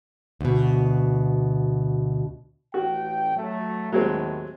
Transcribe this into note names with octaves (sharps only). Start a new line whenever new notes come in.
D2 B2
A1 F#4 G5
F#3 A3
D#2 A2 F#3 G#3 C4